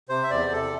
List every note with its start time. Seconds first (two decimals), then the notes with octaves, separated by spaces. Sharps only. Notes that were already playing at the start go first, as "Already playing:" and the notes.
0.09 C3 C5
0.23 E5
0.30 E2 D5
0.52 C3 A4